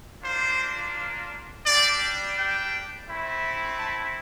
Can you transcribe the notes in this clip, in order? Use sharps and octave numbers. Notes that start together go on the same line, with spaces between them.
A#3 D4 F4 C5
G3 D4 G4 D5
G5
A3 C4 E4
A5